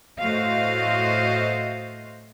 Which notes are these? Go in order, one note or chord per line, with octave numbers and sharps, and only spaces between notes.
A2 A3 F#4 C5 D#5 F5